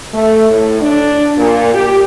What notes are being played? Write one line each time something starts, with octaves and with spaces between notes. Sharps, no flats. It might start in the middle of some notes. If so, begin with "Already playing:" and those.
A3
A2
D4
A#2
G4